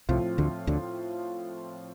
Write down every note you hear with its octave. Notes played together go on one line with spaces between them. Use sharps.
C2 A2 C3 F3 C4 F4
D2 D3
D2 D3